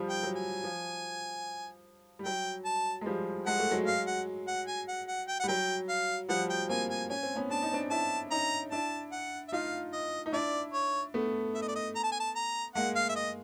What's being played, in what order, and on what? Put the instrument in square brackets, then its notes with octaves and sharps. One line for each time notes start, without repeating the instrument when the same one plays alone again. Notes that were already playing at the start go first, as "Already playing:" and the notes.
Already playing: [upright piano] F3 G3
[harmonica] G5
[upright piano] F#3
[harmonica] G#5
[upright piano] F3
G3
[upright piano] F#3 [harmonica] G5
[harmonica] A5
[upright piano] G#3
F3 G3
[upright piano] G#3 [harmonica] F#5
[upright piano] A3
F#3 G#3
[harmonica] F5
F#5
F#5
G#5
F#5
F#5
G5
F#5
[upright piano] G3
[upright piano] F#3 [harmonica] G5
[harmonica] F5
[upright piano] F3 G3 [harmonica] F#5
[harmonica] G5
[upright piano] A#3 C4 [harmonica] G#5
[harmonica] G#5
[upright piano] C#4 [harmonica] G#5
[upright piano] C4
B3 C#4
[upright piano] D4 [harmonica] A5
[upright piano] D#4
C4 D4
[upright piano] D4 E4 [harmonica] A5
[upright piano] C#4 D#4 [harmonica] A#5
[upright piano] D4 E4 [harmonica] A5
[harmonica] F#5
E5
[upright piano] D#4 F4 [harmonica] F5
[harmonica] D#5
[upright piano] D#4
[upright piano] D4 E4 [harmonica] D5
[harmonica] C#5
[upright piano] A3 B3
[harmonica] E5
D#5
D5
D#5
A#5
A5
G#5
A5
A#5
[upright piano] G#3 A#3 [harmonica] F#5
[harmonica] F5
E5
D#5